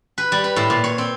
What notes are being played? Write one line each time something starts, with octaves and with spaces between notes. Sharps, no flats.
B4
G3
B4
A2
A#2
C#5
C4